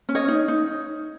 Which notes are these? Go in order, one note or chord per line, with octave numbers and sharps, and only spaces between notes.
C#4
C#5 D#5
D#4
D#4